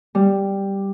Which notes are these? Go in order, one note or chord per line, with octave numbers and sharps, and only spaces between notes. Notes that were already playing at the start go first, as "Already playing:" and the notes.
G3